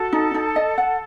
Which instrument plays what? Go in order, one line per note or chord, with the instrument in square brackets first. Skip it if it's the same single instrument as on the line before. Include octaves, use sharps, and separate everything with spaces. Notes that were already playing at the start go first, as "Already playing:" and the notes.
Already playing: [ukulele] F#4 [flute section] A4
[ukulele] D#4
D#4
D#5
F#5